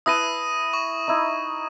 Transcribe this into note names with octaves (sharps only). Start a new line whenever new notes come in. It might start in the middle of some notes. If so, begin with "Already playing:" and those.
E4 B4 A5 D#6 A#6 D#7
C#6
D#4 E4